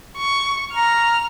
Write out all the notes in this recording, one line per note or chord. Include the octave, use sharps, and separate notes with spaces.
C#6
A#5 F6